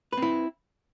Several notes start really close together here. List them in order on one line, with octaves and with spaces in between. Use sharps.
B4 C4 E4